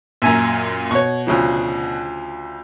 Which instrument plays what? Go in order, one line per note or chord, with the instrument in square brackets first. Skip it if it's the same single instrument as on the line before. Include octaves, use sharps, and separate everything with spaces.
[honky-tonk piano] F#2 A#2 [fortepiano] E5 G#5 A#5
[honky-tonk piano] B2 [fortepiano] C#5 C#6
[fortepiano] D2 C#3 F3